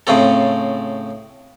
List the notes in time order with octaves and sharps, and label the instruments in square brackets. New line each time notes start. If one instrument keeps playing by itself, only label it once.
[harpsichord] A2 C#3 C4 A4